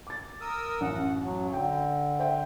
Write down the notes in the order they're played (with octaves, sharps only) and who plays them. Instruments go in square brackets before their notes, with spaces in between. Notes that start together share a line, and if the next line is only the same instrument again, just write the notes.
[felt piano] D6 A6
[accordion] A#4 D#6 E6
[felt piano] A1 F#2 [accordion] F#5
[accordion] F#3
[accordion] D3 [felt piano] G5
[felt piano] C5 E5 G5